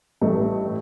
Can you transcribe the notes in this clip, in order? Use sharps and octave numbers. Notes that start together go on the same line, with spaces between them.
A1 G2 A3 D#5